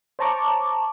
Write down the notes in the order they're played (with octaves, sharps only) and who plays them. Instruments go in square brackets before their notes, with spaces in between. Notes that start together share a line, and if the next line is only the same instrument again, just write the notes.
[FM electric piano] C5 C#5 A5 A#5 C#6 D6